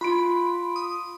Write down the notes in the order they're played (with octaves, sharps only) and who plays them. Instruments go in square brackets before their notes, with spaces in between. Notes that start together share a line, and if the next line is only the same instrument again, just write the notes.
[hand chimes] F4 C6 D7 [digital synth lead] B5
[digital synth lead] D#6